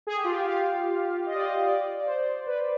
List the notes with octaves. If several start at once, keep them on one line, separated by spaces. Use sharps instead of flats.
G#4
G4
F4
G4
F5
D#5
D5
D#5
D5
C5
B4